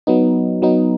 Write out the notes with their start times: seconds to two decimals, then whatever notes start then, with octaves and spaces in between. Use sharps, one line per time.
0.07 F#3 B3 D#4
0.62 F#3 B3 D#4